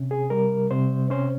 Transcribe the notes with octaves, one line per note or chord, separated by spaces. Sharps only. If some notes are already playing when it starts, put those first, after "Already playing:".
Already playing: C3 C#4
G#4
G3 A#4
C3 C5
C#4 C5